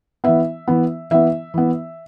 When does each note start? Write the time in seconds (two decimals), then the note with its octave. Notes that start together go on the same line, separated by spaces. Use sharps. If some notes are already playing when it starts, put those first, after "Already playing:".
0.24 E3 B3 E5
0.68 E3 B3
1.11 E3 B3 E5
1.54 E3 B3